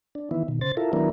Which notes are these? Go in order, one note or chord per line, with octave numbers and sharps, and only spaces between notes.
D4
D#3 E3 B3 E4
B2 D#3
C#3 C5 A6
E4 F4 A4 A#4
D#3 F#3 B3 D4 E4 A#4